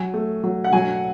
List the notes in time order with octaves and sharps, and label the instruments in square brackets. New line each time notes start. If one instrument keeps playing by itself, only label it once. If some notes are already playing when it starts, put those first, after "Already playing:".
Already playing: [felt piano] F#3 [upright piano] G#5
[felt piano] A3
F#3
[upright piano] F#5
[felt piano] F#3 [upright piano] G#5